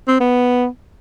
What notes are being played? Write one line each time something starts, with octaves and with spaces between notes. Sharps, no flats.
C4
B3